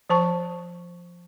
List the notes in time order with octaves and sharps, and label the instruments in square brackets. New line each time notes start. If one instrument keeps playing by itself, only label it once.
[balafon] F3 C5 A5 C#6